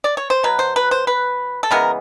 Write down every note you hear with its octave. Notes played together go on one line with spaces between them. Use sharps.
D5
C#5
C5
B2 F#3 B4
C5
B4
C5
B4
A4
C#3 E3 G#3 B3 A#4